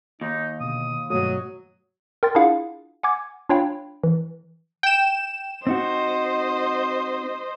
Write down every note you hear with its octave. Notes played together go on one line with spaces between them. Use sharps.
D#2 D#4
B2 D3 D#6
G2 B2 F#3 A3 D#6
A#4 G5 C6 A6
D4 E4 F4 G#4 F5 F#5
F#5 G#5 D6 G#6
D4 F4 C#5 F5 G5 B5
E3
G5 E7
C4 D#4 F#4 C5 D#5